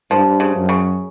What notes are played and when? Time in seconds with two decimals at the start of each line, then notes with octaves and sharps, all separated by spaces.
0.11 G2 F3
0.40 C#3
0.55 F#2
0.69 C#3